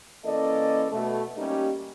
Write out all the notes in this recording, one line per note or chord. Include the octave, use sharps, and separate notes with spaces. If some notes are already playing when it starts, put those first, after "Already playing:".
E3 A#3 C#4 A4 D5 D#5
B2 A3
G3 A#3 C#4 D#4 G4